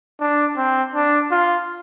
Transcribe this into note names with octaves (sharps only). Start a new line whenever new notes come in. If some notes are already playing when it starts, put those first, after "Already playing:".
D4
C4
D4
F4